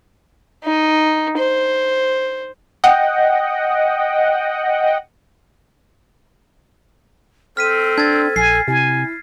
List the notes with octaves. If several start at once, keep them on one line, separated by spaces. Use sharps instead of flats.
D#4
C5
D#5 F#5 G5
C4 A4 F6 B6 D#7
D4 G#6 A6
A#1 G#5 C7
C3 E4 G#5